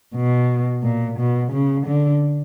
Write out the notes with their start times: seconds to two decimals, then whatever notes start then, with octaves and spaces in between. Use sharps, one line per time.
0.15 B2
0.83 A#2
1.19 B2
1.53 C#3
1.86 D3